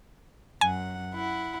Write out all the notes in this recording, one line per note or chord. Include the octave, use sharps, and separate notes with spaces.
F#2 F#5 G#5
E4 F#5